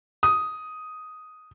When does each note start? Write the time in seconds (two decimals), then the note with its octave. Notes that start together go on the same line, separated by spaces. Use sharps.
0.23 D#6